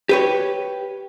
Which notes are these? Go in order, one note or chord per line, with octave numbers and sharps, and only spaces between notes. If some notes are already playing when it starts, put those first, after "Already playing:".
G4 B4 C#5